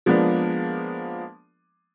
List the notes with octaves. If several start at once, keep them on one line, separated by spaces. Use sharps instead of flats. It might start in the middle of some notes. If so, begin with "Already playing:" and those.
F3 G#3 A#3 B3 D4